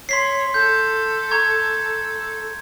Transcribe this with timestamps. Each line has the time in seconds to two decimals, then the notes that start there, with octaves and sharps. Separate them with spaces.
0.09 C#5 C6 B6 C7
0.54 A4 G6
1.31 A#5 C#6 G#6